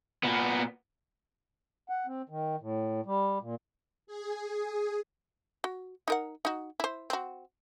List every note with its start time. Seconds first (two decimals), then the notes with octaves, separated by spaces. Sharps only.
0.23 A#2 B3
1.89 F#5
2.06 C4
2.29 D#3
2.61 A2
3.06 G3
3.41 A#2
4.07 G#4
5.64 F#4
6.08 D#4 A#4 F#5
6.45 D#4 F#4
6.80 E4 C5
7.10 C4 F#4